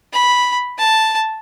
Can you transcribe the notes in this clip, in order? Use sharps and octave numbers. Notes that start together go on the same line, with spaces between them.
B5
A5